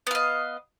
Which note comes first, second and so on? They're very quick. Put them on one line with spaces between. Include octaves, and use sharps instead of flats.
B3 F5 D#5